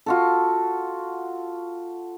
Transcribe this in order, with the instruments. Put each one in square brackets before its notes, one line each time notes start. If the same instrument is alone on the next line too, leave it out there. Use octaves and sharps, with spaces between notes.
[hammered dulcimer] F4 F#4 A4